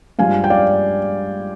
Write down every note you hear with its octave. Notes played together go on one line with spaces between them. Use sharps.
G2 F3 G#3 F5 G#5
G5
D5 F5